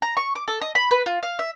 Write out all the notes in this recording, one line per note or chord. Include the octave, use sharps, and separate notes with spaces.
A#5
C#6
D6
A4
D#5
B5
B4
F4
F5
E5